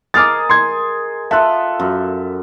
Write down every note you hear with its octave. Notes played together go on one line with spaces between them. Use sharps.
G#4 A#4 D#5 D6 F6 A6
C6 G#6
F4 A4 E5 F#6
F#2